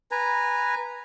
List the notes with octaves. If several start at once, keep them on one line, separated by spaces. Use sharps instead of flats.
B4 G#5 A#5